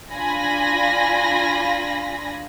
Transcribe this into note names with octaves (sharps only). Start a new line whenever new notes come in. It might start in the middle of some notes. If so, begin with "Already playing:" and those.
D4 F4 G#5 B5 A#6